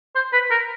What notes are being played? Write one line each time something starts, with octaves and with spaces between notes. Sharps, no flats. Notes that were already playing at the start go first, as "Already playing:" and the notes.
C5
B4
A#4